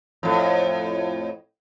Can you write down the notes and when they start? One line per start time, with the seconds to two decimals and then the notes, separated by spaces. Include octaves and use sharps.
0.23 F2 A2